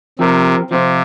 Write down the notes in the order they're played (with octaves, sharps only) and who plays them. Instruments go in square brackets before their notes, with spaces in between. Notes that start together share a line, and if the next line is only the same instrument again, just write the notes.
[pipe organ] C3 [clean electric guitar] F3 C4 G4 A#4
[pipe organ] C3 [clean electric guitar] F3 C4 F4